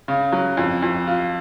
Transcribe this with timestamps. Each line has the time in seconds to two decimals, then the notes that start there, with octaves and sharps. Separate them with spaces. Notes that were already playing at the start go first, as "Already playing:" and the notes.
0.08 C#3
0.32 F#3
0.57 F2
0.82 F2
1.07 F4